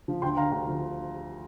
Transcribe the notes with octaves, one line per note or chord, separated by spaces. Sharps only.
F3
D2 G5 C6
D3 F5 A#5
D2 F5
F3